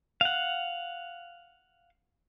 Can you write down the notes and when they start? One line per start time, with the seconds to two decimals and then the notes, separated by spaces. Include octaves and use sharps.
0.21 F5 F#5